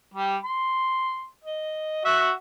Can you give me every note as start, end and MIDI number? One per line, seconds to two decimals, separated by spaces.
0.14 0.36 55
0.14 0.36 67
0.44 1.25 84
1.44 2.03 75
2.05 2.31 66
2.05 2.31 76
2.05 2.31 78